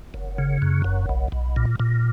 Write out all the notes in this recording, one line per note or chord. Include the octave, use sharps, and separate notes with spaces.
F#1
C#3
F#2
F#1
B1
B1
A#2
A#2